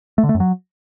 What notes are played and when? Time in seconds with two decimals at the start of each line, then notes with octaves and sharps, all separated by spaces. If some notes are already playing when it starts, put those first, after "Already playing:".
0.18 A3
0.24 D3
0.29 A3
0.35 F#2
0.40 F#3